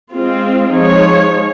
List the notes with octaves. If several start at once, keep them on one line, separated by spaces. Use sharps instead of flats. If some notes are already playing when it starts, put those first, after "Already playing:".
G#3 C4 F4
F3 G#3 D#4 G#4 C#5